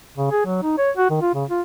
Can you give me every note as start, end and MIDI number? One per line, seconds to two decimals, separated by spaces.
0.18 0.31 49
0.31 0.44 68
0.45 0.62 54
0.63 0.74 63
0.78 0.91 73
0.97 1.09 66
1.10 1.17 51
1.22 1.30 65
1.34 1.45 49
1.50 1.62 65